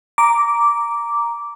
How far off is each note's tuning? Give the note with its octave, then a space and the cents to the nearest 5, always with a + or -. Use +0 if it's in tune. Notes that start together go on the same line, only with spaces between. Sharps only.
A#5 +0 D6 -10